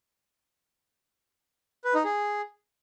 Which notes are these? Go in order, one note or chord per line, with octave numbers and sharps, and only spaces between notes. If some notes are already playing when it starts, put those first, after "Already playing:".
B4
D#4
G#4